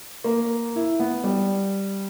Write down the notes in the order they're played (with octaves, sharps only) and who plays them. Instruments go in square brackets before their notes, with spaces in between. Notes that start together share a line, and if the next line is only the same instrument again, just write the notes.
[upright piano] A#3
E4
B3
G3